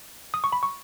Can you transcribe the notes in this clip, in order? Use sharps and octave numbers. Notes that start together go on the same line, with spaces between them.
D#6
C#6
B5
C#6